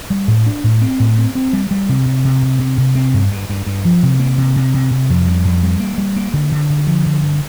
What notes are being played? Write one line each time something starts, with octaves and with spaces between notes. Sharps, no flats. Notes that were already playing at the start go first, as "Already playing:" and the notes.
G3
A2
D4
A2
C4
A2
C4
C4
G3
G3
C3
C3
C3
C3
C3
C3
C4
G2
G2
G2
G2
F3
C3
A#3
C3
C3
C3
C3
F2
G3
F2
G3
A#3
G3
A#3
D3
D3
D3
F3
D3
G2